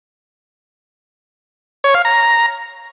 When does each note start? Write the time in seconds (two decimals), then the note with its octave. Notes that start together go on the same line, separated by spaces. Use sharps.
1.84 C#5
1.94 F5
2.05 A#5